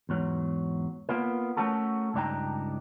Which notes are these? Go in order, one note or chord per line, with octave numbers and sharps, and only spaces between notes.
E2 G#2 F#3
A#3 B3 F4 A#4
A3 C#4 F#4 A4 A#4
C#2 G2 D4 D#4 G5 A#5